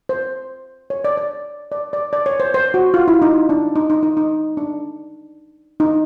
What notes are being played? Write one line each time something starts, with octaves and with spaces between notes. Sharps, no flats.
C5
C#5
D5
D5
D5
D5
D5
C#5
C5
C5
F#4
F4
E4
D#4
D4
D#4
D#4
D#4
D#4
D4
D#4